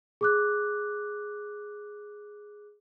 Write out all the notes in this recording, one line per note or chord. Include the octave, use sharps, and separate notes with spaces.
G#4 D6 F#6